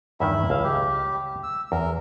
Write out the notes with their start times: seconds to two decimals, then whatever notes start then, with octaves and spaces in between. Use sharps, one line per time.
0.20 E2 G2 D#3 E4 E5
0.50 C#2 F5
0.64 G4
1.43 E6
1.72 E2 A#4